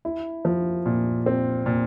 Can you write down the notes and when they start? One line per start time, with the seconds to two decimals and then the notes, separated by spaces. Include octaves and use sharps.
0.05 E4
0.45 F3
0.86 A#2
1.26 C4
1.66 A#2